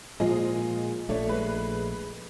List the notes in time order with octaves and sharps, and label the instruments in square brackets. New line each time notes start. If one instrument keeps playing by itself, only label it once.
[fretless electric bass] A#2 F3 G#3 [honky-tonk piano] F4 G#4 D#5
[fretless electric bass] A#1 A3 [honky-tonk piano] D4 C#5
[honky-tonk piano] G#3 B4